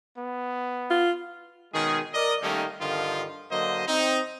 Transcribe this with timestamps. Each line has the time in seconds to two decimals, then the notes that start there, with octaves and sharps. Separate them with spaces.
0.18 B3
0.91 F4
1.73 B2 D#3 G#3 C#4 G#4
2.13 A#4 D5 D#5
2.42 D#3 G3 A3 A#3 C#4 D#4
2.80 G2 D3 D#3 F3 D#4 F4
3.51 D3 F#3 A#3 C5 D#5
3.87 C4 D#4